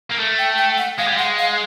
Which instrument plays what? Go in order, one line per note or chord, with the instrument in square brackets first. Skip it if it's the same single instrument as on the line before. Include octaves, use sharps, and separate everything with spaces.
[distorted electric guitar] A#3
A3
[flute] G5
G5
F#5
[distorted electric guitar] G#3 [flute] F5
[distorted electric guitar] G3
[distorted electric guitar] G#3 [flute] F#5
[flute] F5